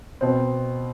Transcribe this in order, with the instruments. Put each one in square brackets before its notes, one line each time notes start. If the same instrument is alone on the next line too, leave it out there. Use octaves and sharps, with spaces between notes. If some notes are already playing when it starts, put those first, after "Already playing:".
[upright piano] B2 C4